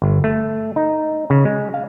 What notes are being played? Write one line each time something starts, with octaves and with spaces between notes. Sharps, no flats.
G1
A3
D#4
C#3
G#3
F5